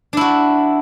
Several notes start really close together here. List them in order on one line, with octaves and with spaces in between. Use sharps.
D4 E4 F#4